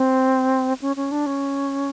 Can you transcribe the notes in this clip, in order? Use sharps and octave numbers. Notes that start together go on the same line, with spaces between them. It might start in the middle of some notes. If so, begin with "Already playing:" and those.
Already playing: C4
C#4
C#4
D4
C#4